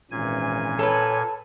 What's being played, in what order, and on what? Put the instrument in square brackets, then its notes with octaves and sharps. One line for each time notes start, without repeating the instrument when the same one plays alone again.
[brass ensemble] G#1 E3 C#4 [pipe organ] A#2 G#5
[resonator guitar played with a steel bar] A4 B4 [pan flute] C#5